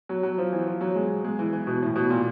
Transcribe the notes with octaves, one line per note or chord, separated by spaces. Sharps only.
F#3
F#3
F3
E3
F3
F#3
G#3
G#3
E3
E3
B2
A2
B2
A#2